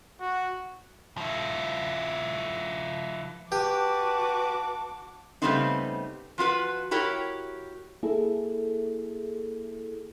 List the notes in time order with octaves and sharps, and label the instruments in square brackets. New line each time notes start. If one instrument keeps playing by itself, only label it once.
[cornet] F#4
[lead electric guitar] F3 E4
[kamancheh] F#4 D6 [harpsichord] G4 [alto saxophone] B4 [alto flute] A5
[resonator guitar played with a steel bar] C#3 G3 A3 B3 C4 D#4
F3 F4 F#4 B4
E4 F#4 G4 A#4 C#5
[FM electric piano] A#3 E4 G#4 A4